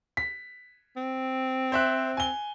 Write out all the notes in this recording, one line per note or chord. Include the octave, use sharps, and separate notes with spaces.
B6
C4
C5 E5 F#6
G#5 G7